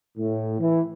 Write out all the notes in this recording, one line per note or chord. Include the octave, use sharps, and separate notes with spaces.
A2
E3